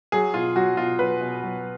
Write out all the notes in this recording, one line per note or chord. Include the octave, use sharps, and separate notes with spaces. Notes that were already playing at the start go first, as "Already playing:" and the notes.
F#3 G#4
B2 F4
F#3 F#4
B2 F4
F#3 B4
B2
F#3